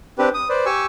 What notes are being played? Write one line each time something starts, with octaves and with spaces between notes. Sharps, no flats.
C4 D4 G4 B4
D#6
B4 C5 D5
G4 G#5 C#6 E6